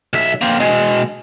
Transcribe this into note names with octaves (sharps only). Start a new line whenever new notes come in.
B1 E5
A#3 C4
B2 G#3